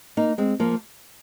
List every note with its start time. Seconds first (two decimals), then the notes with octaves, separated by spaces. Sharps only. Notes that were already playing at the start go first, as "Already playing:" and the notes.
0.17 A#3 D#4
0.38 G#3 C4
0.60 F3 A#3